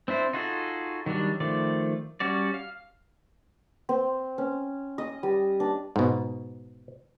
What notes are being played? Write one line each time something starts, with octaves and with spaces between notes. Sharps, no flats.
C4 D4 E4 C5
D#4 F4 F#4 G#4 A4
D#3 F#3 G3 D4
D#3 F3 A3 D5
G3 C#4 F#4 D5
F5
C4
C#4
D#5
G3
D4
G#2 B2